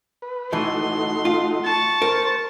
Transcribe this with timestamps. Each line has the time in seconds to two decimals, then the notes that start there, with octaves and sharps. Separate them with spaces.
0.22 B4
0.52 A2 E3 A3 D#4 F#4 C6
1.25 F4
1.64 A5 C#6
2.02 A#4 C5